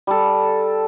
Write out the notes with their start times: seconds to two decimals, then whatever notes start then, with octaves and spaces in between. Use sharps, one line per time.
0.07 G3 A4